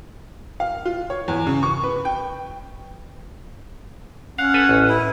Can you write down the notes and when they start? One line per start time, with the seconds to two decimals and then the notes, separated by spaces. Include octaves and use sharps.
0.60 F5
0.85 F4
1.10 C#5
1.28 E2
1.47 C#3
1.63 C#6
1.84 B4
2.05 G5
4.38 C#4 F5 F#5
4.54 A4 B4 G#5
4.69 A1
4.89 E4